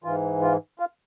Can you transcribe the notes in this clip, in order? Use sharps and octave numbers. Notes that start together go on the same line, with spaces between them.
G#2 E3 F4
F4
F4